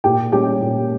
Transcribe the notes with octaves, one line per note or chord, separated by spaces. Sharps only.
A#2 G4 G5
G3 C#4 G4 G5
A#2